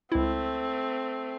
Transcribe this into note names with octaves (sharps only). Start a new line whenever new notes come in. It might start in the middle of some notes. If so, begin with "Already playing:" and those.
C#2 A3 C4 E4